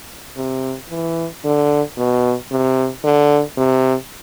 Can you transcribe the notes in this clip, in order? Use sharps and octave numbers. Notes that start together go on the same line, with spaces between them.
C3
E3
D3
B2
C3
D3
C3